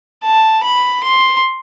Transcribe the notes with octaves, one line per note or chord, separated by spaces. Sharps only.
A5
B5
C6